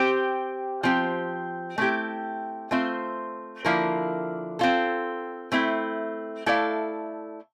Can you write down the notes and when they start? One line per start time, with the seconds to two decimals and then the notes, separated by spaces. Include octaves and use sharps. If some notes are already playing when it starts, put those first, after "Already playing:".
Already playing: C4 G4 C5
0.83 F3 C4 G4
1.78 A3 C4 E4 G4
2.71 A3 C4 F4 C5 E5
3.65 D3 F3 A#3 E4 A#4
4.59 C4 F4 A4
5.52 A3 C4 E4
6.46 A3 E4 A4 D5 F5